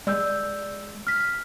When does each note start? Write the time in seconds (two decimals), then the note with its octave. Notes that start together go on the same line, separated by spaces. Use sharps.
0.07 G#3 D5 E6 G6
1.07 F6 B6